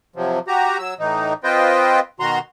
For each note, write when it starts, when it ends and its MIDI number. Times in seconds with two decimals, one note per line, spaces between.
0.16 0.39 48
0.16 0.39 53
0.16 0.39 54
0.48 0.78 66
0.48 0.78 67
0.48 0.78 82
0.79 0.94 54
0.79 0.94 88
0.99 1.33 45
0.99 1.33 52
0.99 1.33 63
1.44 2.00 60
1.44 2.00 65
1.44 2.00 71
1.44 2.00 72
1.44 2.00 75
1.44 2.00 79
2.20 2.39 47
2.20 2.39 51
2.20 2.39 66
2.20 2.39 82
2.20 2.39 84